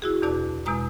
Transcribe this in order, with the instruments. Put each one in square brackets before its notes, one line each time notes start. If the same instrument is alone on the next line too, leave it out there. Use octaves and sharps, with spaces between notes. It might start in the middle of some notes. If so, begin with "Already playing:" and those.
[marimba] E4 F#4 G#4
E2 B2 D4 D5 A5 F#6
E2 B2 G#3 G#5 A#5 D#6